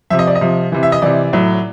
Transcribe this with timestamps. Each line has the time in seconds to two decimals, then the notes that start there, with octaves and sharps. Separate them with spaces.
0.10 C3 F3 E5
0.19 D#5
0.27 D5
0.35 D#5
0.41 C3 F3
0.72 C3 E3
0.83 E5
0.92 D#5
1.02 C3 E3 D5
1.33 A2 F#3